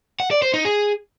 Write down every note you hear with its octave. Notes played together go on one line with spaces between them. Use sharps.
F#5
D5
C5
D#4
G#4